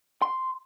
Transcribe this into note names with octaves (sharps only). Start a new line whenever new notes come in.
C6